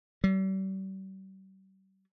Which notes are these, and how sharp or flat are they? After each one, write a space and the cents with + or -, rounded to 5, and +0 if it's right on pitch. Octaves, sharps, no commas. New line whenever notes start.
G3 -40